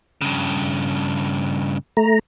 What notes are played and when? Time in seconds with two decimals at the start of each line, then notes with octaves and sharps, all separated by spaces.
0.21 G2 C#3
1.97 A3 A#5